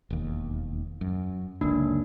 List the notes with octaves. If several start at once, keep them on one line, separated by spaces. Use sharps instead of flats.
E1 D#2
F#2
F#1 C#2 D3 A#3 D4 D#4